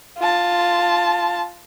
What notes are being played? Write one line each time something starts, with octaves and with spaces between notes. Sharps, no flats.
F4 A5